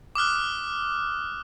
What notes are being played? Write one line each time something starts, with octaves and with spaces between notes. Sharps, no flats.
D6 D#6 F6 F#6